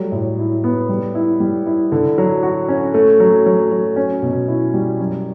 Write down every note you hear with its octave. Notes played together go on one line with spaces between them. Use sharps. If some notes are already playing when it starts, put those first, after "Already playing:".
Already playing: F#3 G3 A3
A2
E4
B3
G3
E4
G3
E4
D3
F#3
F#4
C#4
A3
F#3
F#3
F#3
C#4
B2
E4
G3
F#2